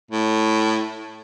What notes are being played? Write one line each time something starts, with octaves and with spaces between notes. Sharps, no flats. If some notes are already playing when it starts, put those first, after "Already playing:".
A2